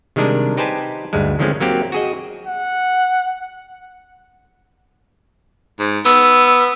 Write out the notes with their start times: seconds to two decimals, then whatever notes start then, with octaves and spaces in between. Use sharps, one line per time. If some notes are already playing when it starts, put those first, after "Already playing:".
0.16 C3 D#3 G3 G#3 D4 A#4
0.57 D#4 G4 B4 C5 G#5 A5
1.13 D2 G2 G3 G#3
1.39 D3 D#3 F3 G#3 C4 C#4
1.60 F#3 A#3 C4 G4
1.92 F#4 G#4 D#5
2.47 F#5
5.79 G#2
6.05 B3 E6